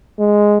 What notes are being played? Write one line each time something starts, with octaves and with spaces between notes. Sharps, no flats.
G#3